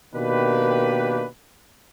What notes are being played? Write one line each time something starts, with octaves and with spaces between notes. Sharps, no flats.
B2 D#3 A#3 D4 G4 B4